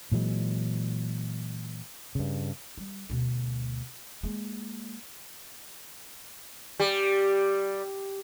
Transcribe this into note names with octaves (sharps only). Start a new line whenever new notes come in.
A#2 E3 F#3 G#3
G2 C#3
G3
D2 B2
G#3 A#3
G3